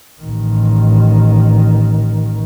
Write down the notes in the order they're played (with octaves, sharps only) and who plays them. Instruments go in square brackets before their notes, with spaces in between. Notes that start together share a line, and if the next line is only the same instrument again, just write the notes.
[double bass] A1 D#3